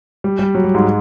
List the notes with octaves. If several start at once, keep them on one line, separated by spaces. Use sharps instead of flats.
G3
G3
F#3
G3
G#2 G#3